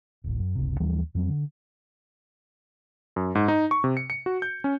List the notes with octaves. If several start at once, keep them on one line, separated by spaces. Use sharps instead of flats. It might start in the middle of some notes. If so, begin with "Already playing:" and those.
D1 A1
F#2
F#1 C#2 C3
D#2 E3 F3 G3
F2 F#3 C4
D3
F#2
G#2
D#4
C#6
C3
C#7
C#7
F#4
G6
C#4